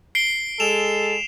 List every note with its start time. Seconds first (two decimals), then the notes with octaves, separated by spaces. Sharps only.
0.15 C7 D7 G7
0.60 G#3 A4 E7 F7